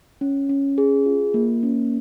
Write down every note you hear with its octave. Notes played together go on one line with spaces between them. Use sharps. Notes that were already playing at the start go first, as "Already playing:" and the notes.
C#4
C#4
G#4
F4
A#3
C#4